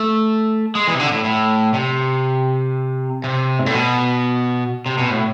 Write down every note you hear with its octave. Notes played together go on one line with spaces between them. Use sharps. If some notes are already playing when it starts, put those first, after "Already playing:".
Already playing: A3
G#3
E3
C3
D3
A2
A2
C3
C3
G#2
A2
B2
C3
B2
A2